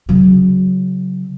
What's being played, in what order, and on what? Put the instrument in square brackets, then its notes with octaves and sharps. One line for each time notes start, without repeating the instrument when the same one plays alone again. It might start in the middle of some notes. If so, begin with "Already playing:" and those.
[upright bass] C#3 F#3